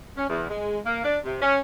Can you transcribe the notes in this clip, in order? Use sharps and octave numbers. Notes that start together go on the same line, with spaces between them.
C#4
E2
G#3
A#3
D4
C3
C#4